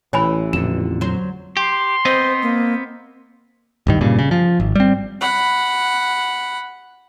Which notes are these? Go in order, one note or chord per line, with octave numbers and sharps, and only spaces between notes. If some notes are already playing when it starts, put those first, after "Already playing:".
A1 E3 C#5 G#5 B5
F2 A#2 D3 E7
F#3 C5
G4 C6
B3 C4 C5 D#5
A#3
D1 G2 D#3
G2 A#2 C#3
C#3
F3
G#1
G3 C4
F#5 B5